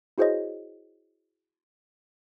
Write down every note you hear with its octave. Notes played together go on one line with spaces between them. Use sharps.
E4 F#4 G#4 C5 C#5 D#5